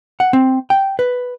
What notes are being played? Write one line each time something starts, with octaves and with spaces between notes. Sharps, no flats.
F#5
C4
G5
B4